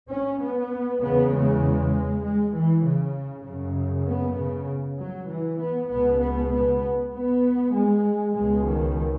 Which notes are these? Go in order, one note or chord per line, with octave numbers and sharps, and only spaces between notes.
C#4
B3
E2 C#3 B3
G#3
G#3
E3
C#3
F#2 C#3
B3
C#3
F#3
E3
B3
C#2 B2 B3
B3
B3
B3
G#3
C#2 B2 G#3
D#3